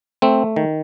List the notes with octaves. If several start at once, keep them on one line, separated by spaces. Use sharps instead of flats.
A3 C4
D#3